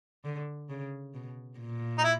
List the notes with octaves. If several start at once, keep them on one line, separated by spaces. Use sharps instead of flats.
D3
C#3
B2
A#2
D#4
E4